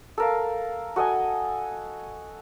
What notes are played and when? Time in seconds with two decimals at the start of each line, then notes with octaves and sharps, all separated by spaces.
0.18 A4 A#4 F5
0.96 F#4 A4 D#5 G#5